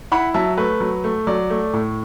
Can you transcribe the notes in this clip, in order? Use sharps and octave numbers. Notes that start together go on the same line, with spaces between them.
E4 F#5 B5
F#3 E5 A5
A3 B4
F#3
A3
F#3 D5
A3
A2